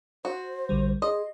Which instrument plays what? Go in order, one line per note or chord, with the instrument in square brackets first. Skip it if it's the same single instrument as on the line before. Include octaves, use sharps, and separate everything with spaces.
[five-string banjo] F#4 [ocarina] C5
[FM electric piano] A#1 D3 G3
[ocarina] G#4 [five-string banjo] D#5 [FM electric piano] C6